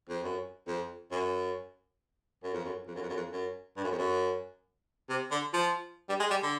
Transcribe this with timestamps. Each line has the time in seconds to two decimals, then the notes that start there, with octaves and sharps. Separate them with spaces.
0.09 F2
0.23 F#2
0.67 F2
1.11 F#2
2.44 F#2
2.54 F2
2.64 F#2
2.88 F2
2.95 F#2
3.02 F2
3.09 F#2
3.16 F2
3.32 F#2
3.77 G2
3.84 F#2
3.91 F2
3.98 F#2
5.10 C3
5.31 D3
5.53 F3
6.09 G3
6.20 G#3
6.30 G3
6.43 D3